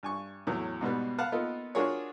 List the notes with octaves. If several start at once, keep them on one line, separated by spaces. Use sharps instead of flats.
G2 G#5 C#6
E2 A2 E3 F#3
G#2 B2 G3 B3
B4 F5 F#5 A5
A#3 B3 D#4 F4 A4 A#4
D4 F4 F#4 G#4 A#4 C#5